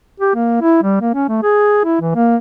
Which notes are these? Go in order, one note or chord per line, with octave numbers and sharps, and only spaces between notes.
G4
A#3
E4
G3
A#3
C#4
A3
G#4
E4
E3
A#3